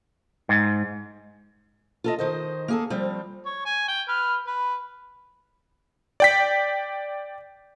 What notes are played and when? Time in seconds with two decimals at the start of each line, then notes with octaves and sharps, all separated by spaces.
0.49 G#2
2.04 F4 A4 D#5
2.19 D#3 C5 D#5
2.68 A#3 G#4 A4
2.90 F3 G3 C4
3.46 C#5
3.66 G#5
3.88 G5
4.09 B4 F6
4.47 B4
6.20 D5 G5 B6